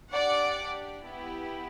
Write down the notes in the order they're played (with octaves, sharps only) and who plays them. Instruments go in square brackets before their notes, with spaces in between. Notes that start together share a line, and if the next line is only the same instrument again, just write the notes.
[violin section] D4 G4 D5 F#5
B3 E4 G4